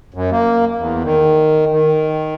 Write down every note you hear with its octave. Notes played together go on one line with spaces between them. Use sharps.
F#2
A#3
E2
D#3
D#3